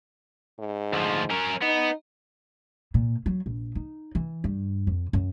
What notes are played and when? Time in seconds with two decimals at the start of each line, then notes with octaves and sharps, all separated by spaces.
0.59 G#2
0.93 D2 F3
1.30 C#4 A#4
1.62 B3 D#4
2.94 A#2
3.26 F#3
3.46 A#1
3.75 D#4
4.15 E3
4.44 G2
4.87 F2
5.13 F#2